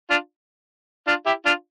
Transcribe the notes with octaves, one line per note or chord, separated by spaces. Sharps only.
D4 F4
D4 F4
E4 G4
D4 F4